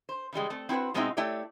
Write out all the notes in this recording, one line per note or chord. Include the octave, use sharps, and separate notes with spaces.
C5
C#3 E3 G3 G#3
A3 C4
C4 E4 F#4 B4 C5
B2 G#3 B3 C4 D#4 E4
A3 E4 G4 C#5 D5